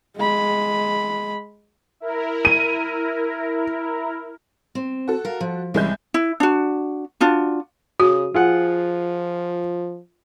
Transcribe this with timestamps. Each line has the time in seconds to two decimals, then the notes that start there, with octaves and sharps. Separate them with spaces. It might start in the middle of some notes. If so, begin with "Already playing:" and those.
0.17 G#3 B5
2.00 E4 A#4
2.45 D#7
4.75 C4
5.08 F#4 A4
5.25 A#4 F5
5.40 F3
5.74 C2 E3 G3 G#3 C#4 G6
6.14 E4
6.40 D4 F#4
7.20 D4 F4 F#4
8.00 C#3 F#4 D#6
8.34 F3 F4 G#4 F#5